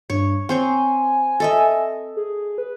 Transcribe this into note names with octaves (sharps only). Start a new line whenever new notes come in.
G2 C#5
C4 C5 C#5 G#5
A4 D#5 E5
G#4
B4